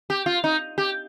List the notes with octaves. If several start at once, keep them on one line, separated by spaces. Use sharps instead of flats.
G4
F4
D#4
G4